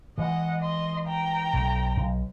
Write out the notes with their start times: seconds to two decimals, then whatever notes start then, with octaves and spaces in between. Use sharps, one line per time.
0.18 E3 G#3 D#5 F#5
0.61 D#5 C6
1.07 G5 A#5
1.53 B1
1.96 B1